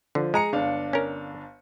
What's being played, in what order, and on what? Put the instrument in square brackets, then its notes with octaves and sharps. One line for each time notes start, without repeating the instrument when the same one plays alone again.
[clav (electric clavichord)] D3 [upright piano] F3
[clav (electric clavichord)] G#3 [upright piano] G#4 A#5 C#7
[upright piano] G1 D4 F5
[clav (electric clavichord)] C#4 A#4